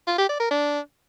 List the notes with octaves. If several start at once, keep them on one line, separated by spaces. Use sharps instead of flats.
F4
G4
D5
A#4
D4